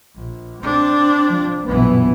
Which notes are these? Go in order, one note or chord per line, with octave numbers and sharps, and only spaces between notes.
A#1
C4 D4
F3
A#1 F#2 B2 E3 B3